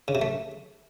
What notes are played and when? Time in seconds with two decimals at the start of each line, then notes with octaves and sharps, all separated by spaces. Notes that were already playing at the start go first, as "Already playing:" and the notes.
0.08 C#3
0.15 C3
0.22 A3